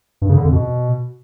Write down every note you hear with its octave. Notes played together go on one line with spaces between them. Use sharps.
G2
C#3
D3
F2
B2